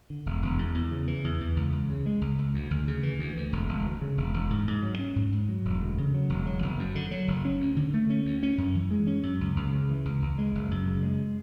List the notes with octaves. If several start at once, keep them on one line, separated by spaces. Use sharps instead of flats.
D3
E1
E1
E2
E2
C#3
E3
E2
E2
C#2
C#2
C#3
G#3
C#2
C#2
D2
D2
C#3
E3
D2
D2
E1
E1
D2
C#3
E1
E1
G#2
G#2
F#3
C#4
G#2
G#2
F#3
E1
D2
C#3
F#3
E1
F#3
F#1
F#2
D3
F#3
F#1
C#4
D2
D3
A3
C#4
D2
C#4
F#2
E3
G#3
C#4
F#2
C#2
C#2
C#3
E3
C#2
C#2
G#3
F#1
F#2
C#3
G#3